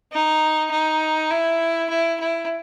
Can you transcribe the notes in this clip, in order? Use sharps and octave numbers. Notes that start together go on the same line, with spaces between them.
D#4
D#4
E4
E4
E4